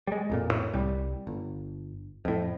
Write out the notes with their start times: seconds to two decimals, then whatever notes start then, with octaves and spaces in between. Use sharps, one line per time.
0.07 G3 G#3
0.30 A1 F2 A#2
0.51 A2
0.74 C2 G3
1.27 G1
2.25 F2 A2